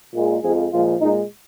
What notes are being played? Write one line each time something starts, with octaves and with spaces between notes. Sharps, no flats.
A#2 G#3
F2 F3 G#3 G#4
A#2 F3 G#3 F4
A#2 G#3 D#4